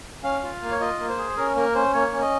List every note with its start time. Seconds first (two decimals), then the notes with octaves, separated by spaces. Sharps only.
0.23 C#4 F5
0.43 F4
0.62 A#3
0.71 C#5
0.80 F4 D#5
0.99 A#3
1.09 C5
1.18 G#4
1.37 C#4 A#4
1.56 A#3 A#4
1.75 C#4 C5
1.94 A#3 C#5
2.13 C#4
2.22 D#5